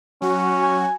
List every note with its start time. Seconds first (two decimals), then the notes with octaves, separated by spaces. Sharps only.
0.22 F#3 C#4 F#4
0.61 G#5